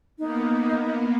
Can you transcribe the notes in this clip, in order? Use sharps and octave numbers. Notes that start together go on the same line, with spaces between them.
A#3 B3 D#4